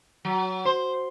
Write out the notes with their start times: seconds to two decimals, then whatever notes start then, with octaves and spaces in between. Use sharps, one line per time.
0.25 F#3
0.65 C5